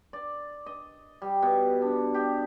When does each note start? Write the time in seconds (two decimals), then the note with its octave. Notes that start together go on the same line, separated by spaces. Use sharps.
0.13 D5
0.66 D#5
1.22 G3
1.42 B2
1.82 D4
2.14 G4